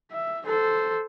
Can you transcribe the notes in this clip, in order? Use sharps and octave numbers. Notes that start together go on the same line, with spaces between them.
E5
A4 C5